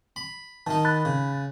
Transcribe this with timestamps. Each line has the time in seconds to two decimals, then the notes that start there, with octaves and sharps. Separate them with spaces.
0.16 B5
0.67 D#3 D#4 A5
0.85 B5 F#6 A6
1.05 C#3